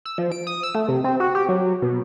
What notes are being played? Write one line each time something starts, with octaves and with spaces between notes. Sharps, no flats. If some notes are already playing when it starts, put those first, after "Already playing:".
E6
F3
D7
D#6
E6
A3
C3
C4
F#4
G4
F#3
B2